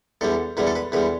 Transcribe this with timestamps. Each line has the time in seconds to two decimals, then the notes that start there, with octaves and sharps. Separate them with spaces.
0.21 E2 D3 G3 A4
0.57 E2 D3 G3 B4
0.67 A4
0.75 B4
0.92 E2 D3 G3 B4